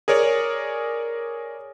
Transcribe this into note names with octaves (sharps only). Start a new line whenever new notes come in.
G#4 A#4 C#5 D5